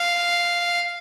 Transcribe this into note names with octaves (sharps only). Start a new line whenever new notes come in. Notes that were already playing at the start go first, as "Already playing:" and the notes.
Already playing: F5